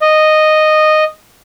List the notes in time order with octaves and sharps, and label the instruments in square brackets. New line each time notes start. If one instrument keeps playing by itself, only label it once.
[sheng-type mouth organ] D#5